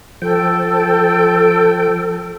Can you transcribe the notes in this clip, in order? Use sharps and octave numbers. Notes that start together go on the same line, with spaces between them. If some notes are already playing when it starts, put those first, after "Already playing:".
F3 A4 G5